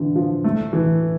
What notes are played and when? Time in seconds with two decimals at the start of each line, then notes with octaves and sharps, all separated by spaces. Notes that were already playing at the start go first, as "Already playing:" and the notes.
Already playing: D3 E3
0.15 F3
0.44 A3
0.73 E3